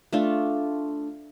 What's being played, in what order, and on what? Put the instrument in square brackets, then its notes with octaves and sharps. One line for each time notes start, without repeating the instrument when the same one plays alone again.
[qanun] A3 D4 F4